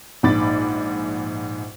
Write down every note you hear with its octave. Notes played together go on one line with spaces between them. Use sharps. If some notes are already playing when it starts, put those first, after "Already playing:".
A#1 G#2 B5 D6 A6